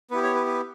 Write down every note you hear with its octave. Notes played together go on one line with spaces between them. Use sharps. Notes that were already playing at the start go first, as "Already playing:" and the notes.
B3 E4 G4 B4
C#5
B4
B4